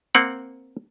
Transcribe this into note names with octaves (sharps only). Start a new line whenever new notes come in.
A#3 C4 F#5